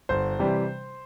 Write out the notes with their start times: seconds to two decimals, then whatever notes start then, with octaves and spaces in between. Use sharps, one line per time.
0.09 G1 C5
0.39 C3 E3 G3